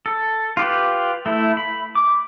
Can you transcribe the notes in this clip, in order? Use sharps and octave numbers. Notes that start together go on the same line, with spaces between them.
A4
F4 G4 B4
A3 E4
B5
D6